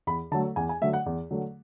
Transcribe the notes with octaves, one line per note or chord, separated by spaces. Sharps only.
E2 B5
D3 F#3 A3 A5
E2 G#5
G#5
D3 F#3 A3 E5
F#5
E2
D3 F#3 A3